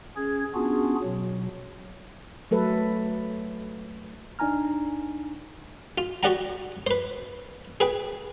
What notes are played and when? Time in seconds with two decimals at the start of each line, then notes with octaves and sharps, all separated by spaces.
0.16 C#4 G#4 G#6
0.54 B3 C#4 D4 F4 F#4 G#4
1.03 B2 F#3
2.51 F#3 A3 A4 B4
4.39 D2 D4 D#4 G#5 A#5 F6
5.98 F4
6.23 F#4 G4 D5 F#5 G5 A#5
6.87 B4 C5
7.80 G#4 B4 G5